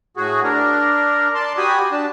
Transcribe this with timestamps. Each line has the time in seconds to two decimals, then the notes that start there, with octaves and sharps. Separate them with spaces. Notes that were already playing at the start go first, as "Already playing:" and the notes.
0.17 A2 F#4 G#4
0.44 D4 A#4
1.35 D5 A5 C6
1.57 F#4 G4 G#5 B5 D#6
1.92 D4 A5